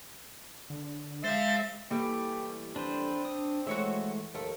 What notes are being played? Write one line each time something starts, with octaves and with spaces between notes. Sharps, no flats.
D3
G#3 C5 E5 F5 A6
E3 G3 A3 A#3 G4
C4 D4 B4 C5
D4 D#6
E3 G#3 A3 F#4 C#5 E5
D#2 F3 A3